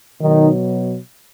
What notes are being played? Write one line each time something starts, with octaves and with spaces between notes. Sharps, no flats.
B2 D#3 F#3 D#4